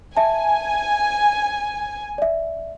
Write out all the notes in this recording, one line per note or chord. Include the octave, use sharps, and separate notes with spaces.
E5 G#5 A5
D5 E5